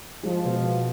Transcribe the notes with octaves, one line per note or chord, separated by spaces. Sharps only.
F3 G#3
B2
B3